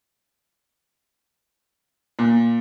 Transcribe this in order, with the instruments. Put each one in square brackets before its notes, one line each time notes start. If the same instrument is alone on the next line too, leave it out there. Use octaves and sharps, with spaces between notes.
[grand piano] A#2